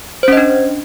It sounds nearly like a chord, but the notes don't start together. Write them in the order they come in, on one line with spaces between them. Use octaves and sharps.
C5 C#4 D#5 D4